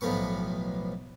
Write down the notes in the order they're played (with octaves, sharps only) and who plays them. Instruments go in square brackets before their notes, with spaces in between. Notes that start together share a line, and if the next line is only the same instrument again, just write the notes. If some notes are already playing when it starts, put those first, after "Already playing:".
[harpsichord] B1 A2 F3 B3 C#6